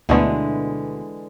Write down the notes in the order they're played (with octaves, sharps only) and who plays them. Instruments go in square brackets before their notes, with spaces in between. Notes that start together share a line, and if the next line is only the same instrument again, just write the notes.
[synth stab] D2 B2 [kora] D3 E3 G#3